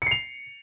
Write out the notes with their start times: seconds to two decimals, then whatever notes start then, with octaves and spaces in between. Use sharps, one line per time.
0.02 C#7
0.07 C7
0.11 F7